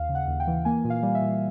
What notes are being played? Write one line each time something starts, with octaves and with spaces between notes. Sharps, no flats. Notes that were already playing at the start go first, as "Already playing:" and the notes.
Already playing: D#2 F5
C#3
F#5
D#2
G5
E3
A#3 G#5
A#2
F5
G3
E5
A#2